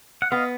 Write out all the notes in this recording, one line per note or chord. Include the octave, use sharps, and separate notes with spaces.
F#5
B3 D#5 F5